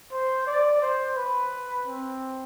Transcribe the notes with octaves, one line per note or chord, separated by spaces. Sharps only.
C5
D5
C5
B4
C4